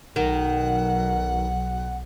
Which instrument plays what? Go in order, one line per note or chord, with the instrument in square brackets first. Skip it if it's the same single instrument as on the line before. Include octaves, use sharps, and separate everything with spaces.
[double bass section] B1 [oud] D#3 [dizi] F#5